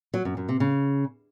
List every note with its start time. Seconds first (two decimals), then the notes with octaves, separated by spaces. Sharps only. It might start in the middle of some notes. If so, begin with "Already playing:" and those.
0.14 F#3
0.25 F#2
0.37 F#2
0.49 C3
0.60 C#3